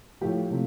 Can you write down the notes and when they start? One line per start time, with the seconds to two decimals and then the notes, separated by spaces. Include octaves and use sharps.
0.21 A2 F3 A3 G4
0.50 C3 F3 A3